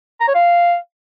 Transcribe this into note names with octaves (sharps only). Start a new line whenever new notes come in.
A#5
C#5
F5